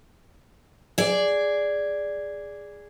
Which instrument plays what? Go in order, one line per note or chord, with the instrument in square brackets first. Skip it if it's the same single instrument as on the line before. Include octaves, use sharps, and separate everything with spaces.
[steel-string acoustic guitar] G#4 D5